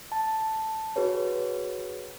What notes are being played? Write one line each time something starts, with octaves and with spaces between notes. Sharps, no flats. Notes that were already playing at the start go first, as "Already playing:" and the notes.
A5
F#4 G#4 B4 C#5